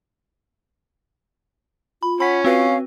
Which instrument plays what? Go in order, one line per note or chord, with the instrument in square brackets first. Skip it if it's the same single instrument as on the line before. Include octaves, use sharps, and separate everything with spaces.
[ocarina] F4 [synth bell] B5
[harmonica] C#4 [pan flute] F#5 [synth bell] B5 B6
[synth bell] C4 F#4 B4 [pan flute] F5